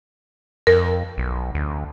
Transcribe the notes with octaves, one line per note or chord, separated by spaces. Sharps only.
F2 A#4
B1
D2